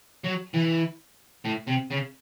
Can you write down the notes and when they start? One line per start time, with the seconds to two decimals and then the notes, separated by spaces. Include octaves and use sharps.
0.24 F#3
0.54 E3
1.45 A2
1.67 C3
1.91 C#3